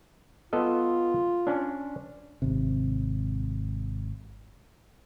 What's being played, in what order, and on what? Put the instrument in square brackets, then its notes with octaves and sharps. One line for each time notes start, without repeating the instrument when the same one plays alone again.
[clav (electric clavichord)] B3 A4 D#5 [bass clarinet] F4
[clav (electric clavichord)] C#4 D4
[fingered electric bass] G#1 C3